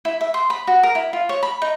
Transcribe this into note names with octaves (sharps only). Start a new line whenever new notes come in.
E4
E5
C6
B5
F#4
A#4
E4
F4
C#5
B5
D#4